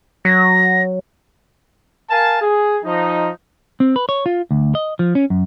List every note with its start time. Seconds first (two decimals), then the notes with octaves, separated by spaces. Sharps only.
0.25 F#3 A#6
2.10 A#4 F5 G#5 A5
2.41 G#4
2.84 F3 D#4
3.80 C4
3.96 B4
4.09 C#5
4.26 F4
4.51 D2
4.75 D#5
4.99 F3
5.15 C#4
5.30 F#2